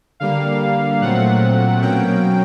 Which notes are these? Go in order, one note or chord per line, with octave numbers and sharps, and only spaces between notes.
D3 G3 A#3 F5
A#2 F#3 A3 C4 F#5
B2 F#3 A#3 C#4 G5